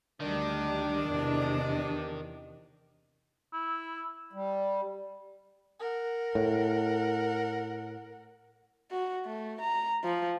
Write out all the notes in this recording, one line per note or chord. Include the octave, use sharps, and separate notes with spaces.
D2 D#3 G3 D4
E2 C3
E4
G3
A#4 F#5
A2
F#4
A3
A#5
F3